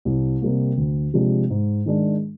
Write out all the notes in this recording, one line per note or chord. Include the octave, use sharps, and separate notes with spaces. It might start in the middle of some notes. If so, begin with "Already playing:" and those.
C2
C3 G3 A#3
D2
C3 F3 G#3 D4
G#2
D#3 G#3 D4